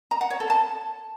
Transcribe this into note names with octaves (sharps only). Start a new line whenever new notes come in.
A#5
F#5
C#5
A4
A5